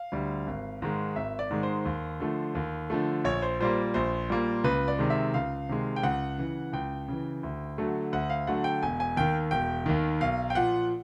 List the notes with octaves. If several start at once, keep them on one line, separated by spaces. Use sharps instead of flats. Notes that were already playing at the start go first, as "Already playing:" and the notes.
Already playing: F5
D2 D3 G3
G#1
G#2 D#3 G#3
G#1 E5
D5
G#2 D#3 G#3
C5
D#2
D3 F3 A3
D#2
D3 F3 A3
A#1 C#5
C5
A#2 G3 A#3 C5
A#1 C5
A#2 G3 A#3
C#2 B4
D5
C3 D#3 G#3
E5
C#2 F5
C3 D#3 G#3
G5
C#2 F#5
C#3 E3
C#2 G5
C#3 E3
D2
D3 F#3 A3
D2 F#5
F5
D3 F#3 A3 F#5
G5
E1 G#5
G#5
D#2 D#3 G5
E1 G5
D#2 D#3
B1 F5
G5
A#2 F3 F#5